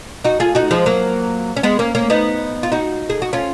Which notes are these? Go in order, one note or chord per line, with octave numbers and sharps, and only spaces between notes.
D#4 F#4
F4 G#4
D#4 F#4
F3 G#3
F#3 A#3
C#4
G#3 B3
A#3 C#4
A#3 C#4
B3 D#4
F4
D#4 F#4
G#4
F#4
C#4 F4